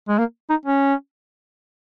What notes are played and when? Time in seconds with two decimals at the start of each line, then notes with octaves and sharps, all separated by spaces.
0.09 G#3
0.19 A#3
0.50 D#4
0.66 C#4